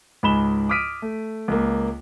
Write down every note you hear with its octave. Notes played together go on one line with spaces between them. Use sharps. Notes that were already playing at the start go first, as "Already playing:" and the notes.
C#2 G#2 B5 E7 G7
D6 D#6 F6 B6 D7 D#7
A3
C#2 A#3